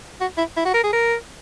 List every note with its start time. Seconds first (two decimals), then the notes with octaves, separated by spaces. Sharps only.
0.21 F#4
0.38 E4
0.57 E4
0.65 F#4
0.74 A#4
0.84 G#4
0.93 A#4